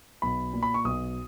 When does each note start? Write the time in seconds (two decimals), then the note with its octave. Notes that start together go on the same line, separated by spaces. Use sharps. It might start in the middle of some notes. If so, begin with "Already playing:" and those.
0.22 B1 B5
0.53 A#2
0.63 B5
0.74 C#6
0.84 B1 D#6